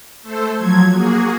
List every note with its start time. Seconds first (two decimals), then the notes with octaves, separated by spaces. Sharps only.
0.22 A3 A4 C5
0.56 F3 F#3 G#6
0.91 A#3 F#4 G#4